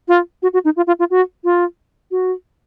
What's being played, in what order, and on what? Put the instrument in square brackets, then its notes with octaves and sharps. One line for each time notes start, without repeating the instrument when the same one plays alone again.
[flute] F4
F#4
F#4
D#4
F4
F4
F4
F#4
F4
F#4